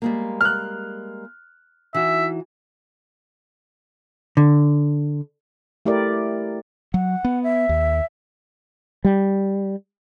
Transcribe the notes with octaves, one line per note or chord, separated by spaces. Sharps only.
G3 G#3 A#3
F6 F#6
E3 D#4 F#4 E5
D3
A3 E4 G4 A#4 D5
F#3 F#5
B3
E5
D#2
G3